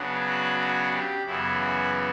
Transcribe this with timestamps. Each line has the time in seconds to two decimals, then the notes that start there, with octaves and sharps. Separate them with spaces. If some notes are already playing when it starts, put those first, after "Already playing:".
Already playing: C#3 F#3 B3 D4
0.26 F#4
0.59 F#4
0.92 G4
1.26 F#2 C#3 E3 B3 E4
1.60 F#4